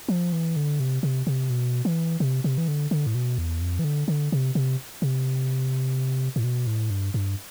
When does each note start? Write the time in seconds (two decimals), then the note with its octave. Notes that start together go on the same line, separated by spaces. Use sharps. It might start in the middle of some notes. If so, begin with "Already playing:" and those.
0.08 F3
0.33 E3
0.56 D3
0.80 C3
1.03 C3
1.27 C3
1.50 B2
1.85 E3
2.20 C3
2.44 C3
2.58 E3
2.68 D3
2.91 D3
3.07 A2
3.15 B2
3.38 E2
3.62 F2
3.79 E3
3.84 D3
4.08 D3
4.32 C3
4.55 C3
5.02 C3
6.36 A2
6.44 B2
6.67 A2
6.90 G2
7.14 G2